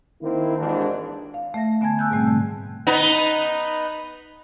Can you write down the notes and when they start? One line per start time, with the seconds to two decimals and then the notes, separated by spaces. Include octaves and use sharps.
0.22 D#3 A#3 C4 E4
0.58 G#1 D#2 G#2 E3 D4
1.34 F5
1.54 A3 E5 A#6
1.81 D3 B3 G#5 A5 G#6
1.99 G#5 E6 F#6 G6
2.11 G#2 B2 G3 A3 C4
2.27 D3
2.87 B3 D#4